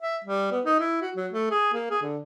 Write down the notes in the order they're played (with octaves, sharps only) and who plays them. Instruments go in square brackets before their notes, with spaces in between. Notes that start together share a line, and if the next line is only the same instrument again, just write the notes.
[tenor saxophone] E5
G3
B3
D#4
E4
F#4
F#3
A3
G#4
A#3
G#4
D3